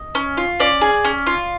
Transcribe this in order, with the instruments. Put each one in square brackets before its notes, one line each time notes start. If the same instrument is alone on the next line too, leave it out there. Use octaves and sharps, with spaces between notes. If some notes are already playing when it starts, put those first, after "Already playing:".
Already playing: [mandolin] D#5
C#4
F4
C#4 D5
G#4
C#4
F4